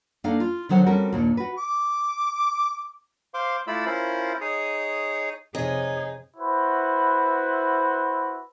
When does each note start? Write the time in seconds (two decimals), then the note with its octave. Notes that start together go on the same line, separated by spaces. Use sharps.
0.24 A#3 D4 D#4 A4 D5 F5
0.40 F4
0.69 D3 D#3 F#3 C5 F#5
0.86 G3 C4 C#4 F#4 A4 A#4
1.13 D#2 A#2 D4
1.37 F#4 B4
1.58 D6
3.34 C5 F5 C6 D6
3.67 A3 E4 F4 D5 B5 E6
3.86 C#4 E4 F4 A#4 C5
4.41 D#4 G#4 C#5 D#6
5.55 F2 C3 D#4 G#4 C#5
6.37 E4 F#4 B4 C5